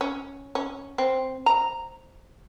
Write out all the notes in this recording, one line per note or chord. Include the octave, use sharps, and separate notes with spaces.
C#4
C#4
C4
A#5